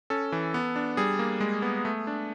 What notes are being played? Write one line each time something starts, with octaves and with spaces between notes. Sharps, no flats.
C#4 A4
E3
B3
D4
G3 G#4
A#3
G#3
B3
A3
D4